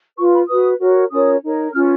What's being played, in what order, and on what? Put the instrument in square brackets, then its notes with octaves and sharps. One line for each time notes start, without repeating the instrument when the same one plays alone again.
[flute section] F4 B4 C#6
B5
F#4 B4 D#6
F#4 A#4 C#5
C#4 F4 A#4 C#5 D#6
D#4 A#4 C#5
C#4 F4 B4 F6